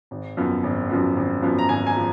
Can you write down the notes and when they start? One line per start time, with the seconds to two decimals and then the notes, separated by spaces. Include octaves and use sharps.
0.11 G#1
0.37 F#2 F3 B3
0.63 G#1
0.90 F#2 F3 B3
1.16 G#1
1.42 F#2 F3 B3
1.59 A#5
1.69 G#1 G#5
1.87 G#5
1.96 F3